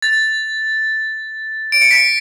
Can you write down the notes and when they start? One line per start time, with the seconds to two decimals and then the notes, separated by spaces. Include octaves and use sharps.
0.02 A6
1.72 D7
1.82 C#7
1.91 B6